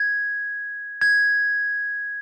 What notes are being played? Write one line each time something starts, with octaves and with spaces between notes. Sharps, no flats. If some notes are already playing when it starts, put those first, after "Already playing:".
Already playing: G#6
G#6